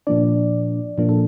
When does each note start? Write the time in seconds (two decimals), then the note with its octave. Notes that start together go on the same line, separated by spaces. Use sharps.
0.07 A#2 F3 A#3 D4 D5
0.98 A#2 F3 A#3 D4
1.09 A4